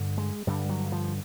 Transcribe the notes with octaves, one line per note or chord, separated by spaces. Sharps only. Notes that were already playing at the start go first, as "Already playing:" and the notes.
Already playing: G2 D3
G#3
G2 D3 G3
F#3
F3